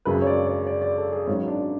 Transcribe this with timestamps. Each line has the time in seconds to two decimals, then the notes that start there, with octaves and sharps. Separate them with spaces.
0.05 G#1 F#2 C#3 G#3 B4
0.22 C#5
0.27 D5
0.47 D5
0.67 D5
0.82 D5
0.98 A4
1.13 G#4
1.27 G#1 G#2 F#3 C#4
1.48 D4